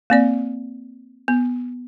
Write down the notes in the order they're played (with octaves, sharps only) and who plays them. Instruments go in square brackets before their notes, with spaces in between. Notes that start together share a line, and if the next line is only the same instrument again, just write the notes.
[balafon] A#3 C4 D5
B3